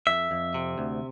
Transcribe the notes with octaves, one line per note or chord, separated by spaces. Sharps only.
F2 E5
F2
C3
D2